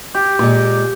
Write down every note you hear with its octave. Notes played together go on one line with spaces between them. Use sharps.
G4
A#2 G#3 D6